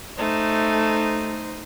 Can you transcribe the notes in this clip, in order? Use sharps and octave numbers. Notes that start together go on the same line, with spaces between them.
A3 D#4 C5